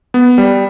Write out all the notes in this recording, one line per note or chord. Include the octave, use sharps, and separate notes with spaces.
B3
G3